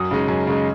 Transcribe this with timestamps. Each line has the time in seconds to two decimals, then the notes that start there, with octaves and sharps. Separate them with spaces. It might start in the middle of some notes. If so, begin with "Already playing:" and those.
Already playing: F#2 D#6
0.11 C#3 G#3 D#4
0.28 F#2
0.47 C#3 G#3 D#4